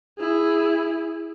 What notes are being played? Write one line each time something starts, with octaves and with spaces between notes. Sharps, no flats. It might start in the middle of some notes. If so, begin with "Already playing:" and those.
E4 G#4